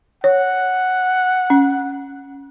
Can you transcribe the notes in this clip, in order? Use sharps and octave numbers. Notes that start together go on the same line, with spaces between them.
C#5 F#5
C#4